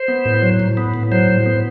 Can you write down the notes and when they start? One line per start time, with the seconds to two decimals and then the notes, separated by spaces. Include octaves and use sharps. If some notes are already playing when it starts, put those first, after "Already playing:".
Already playing: C5
0.08 B3
0.25 A2
0.42 F#3
0.60 A2
0.77 B3
0.94 A2
1.11 F#3 C5
1.29 A2
1.46 B3